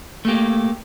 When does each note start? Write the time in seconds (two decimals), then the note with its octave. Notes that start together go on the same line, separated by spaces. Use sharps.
0.25 A3 A#3 G4